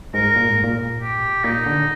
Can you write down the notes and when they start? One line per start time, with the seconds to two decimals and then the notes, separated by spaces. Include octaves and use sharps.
0.14 G#2 A#4
0.36 A#2
0.49 G#2
0.64 A#2
1.01 G4
1.44 A#2 D#4
1.66 D3